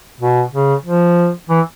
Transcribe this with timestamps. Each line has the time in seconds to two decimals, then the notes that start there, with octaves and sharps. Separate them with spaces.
0.21 B2
0.52 C#3
0.85 F3
1.49 E3